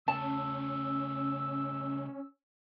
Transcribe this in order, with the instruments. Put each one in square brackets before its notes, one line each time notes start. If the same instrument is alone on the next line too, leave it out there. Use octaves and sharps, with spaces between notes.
[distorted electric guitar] C#3 A3 [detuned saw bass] C#4 [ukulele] A5 [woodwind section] E6